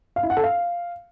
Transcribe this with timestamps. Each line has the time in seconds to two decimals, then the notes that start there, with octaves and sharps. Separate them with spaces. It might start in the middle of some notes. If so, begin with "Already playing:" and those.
0.16 F5
0.23 E4
0.30 F#5
0.37 A4
0.44 F5